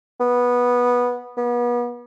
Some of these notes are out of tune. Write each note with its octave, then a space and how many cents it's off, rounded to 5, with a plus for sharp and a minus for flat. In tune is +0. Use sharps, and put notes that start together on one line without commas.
B3 -15
B3 -35